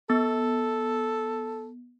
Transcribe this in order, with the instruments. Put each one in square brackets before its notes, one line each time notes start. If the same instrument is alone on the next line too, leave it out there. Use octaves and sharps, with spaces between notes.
[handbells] B3 [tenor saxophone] A4